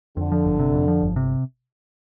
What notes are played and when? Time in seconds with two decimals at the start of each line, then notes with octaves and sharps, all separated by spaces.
0.17 F2 D3
0.32 F3
0.45 G1
0.59 C3
0.74 F2
0.88 F3
1.02 G1
1.16 C3